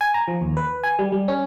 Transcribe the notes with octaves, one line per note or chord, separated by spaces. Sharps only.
G#5
A#5
F3
D#2
B4
G#5
G3
G3
C#4